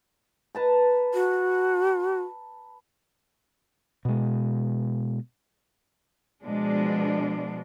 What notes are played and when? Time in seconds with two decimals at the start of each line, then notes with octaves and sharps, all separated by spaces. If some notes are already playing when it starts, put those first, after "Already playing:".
0.55 B4 A5 A#5
1.14 F#4
4.05 B2 G#3
6.43 B2 F3 G#3 D4